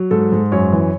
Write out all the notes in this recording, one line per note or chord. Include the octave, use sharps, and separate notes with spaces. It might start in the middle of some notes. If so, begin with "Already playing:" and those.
Already playing: F#3
G#2 A4
G#2
F#2 C#5
E3